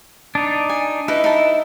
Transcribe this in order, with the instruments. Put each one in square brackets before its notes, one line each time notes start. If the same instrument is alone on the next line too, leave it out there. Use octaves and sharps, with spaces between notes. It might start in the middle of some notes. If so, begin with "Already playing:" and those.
[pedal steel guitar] D4 D#4
[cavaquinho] G#5
[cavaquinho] D#4 B4 [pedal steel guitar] E4
[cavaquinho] D#4 A5